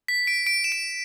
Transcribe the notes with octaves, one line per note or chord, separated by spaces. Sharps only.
B6
D7
D7
E7
D7